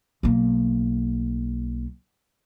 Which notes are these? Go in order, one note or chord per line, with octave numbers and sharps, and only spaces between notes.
B1 A#3